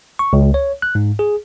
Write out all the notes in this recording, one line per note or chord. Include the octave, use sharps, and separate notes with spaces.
C#6
C#2
C#5
F#6
G#2
G#4